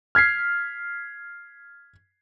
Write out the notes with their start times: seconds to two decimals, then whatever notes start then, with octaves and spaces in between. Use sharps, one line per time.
0.15 F6 G#6 B6 C7